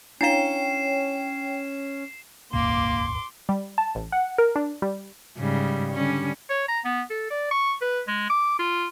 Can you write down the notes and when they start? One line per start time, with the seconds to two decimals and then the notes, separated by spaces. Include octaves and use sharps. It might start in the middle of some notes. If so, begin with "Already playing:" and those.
0.21 C#4 D4 E4 C#5 F5 G5 C7 E7
2.53 D#1 G#1 C#2 A#3 C6 D6
3.49 G3
3.78 A5
3.95 A1
4.12 F#5
4.38 A#4
4.56 D4
4.82 G3
5.38 G#2 C#3 G3
5.93 D3 G3 C#4
6.50 C#5
6.68 A#5
6.85 B3
7.10 A4
7.30 D5
7.51 C#6
7.82 B4
8.08 G#3
8.30 D6
8.59 F4